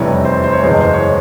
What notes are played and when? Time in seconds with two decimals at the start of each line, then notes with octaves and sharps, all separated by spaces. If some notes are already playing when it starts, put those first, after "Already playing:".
Already playing: F1 E2 C3 E3 G3 C#5
0.25 C5
0.44 C5
0.53 C#5
0.63 F#1 E2 B2 G#3 C5
0.81 C5
0.93 C#5